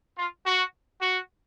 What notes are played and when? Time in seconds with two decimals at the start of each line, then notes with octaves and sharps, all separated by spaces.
0.17 F4
0.44 F#4
1.00 F#4